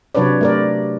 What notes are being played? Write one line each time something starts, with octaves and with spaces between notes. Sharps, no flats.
C3 F#3 D4 B4 C#5 D5
A3 A#4 D5